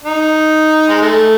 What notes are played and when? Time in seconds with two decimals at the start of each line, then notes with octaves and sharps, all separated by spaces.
0.04 D#4
0.89 G#3
1.02 A3